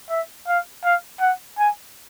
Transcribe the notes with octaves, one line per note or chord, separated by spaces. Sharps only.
E5
F5
F5
F#5
G#5